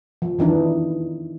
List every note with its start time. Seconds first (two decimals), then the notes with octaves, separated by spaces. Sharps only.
0.22 F3
0.39 D#3 E3 D4 D#4